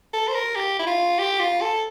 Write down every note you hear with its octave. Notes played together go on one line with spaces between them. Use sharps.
A4
C5
A#4
G4
E4
F4
G4
F4
A4